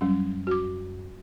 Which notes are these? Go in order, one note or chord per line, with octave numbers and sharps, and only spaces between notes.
F#2 F#3 G3 C#4
F#4 D6